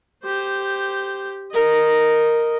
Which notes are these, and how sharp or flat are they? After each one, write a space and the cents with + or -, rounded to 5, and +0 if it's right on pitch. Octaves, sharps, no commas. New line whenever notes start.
G4 +0 C5 -10
A#4 +0 D#5 -5